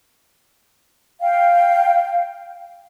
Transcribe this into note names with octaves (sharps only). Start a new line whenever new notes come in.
F5 G5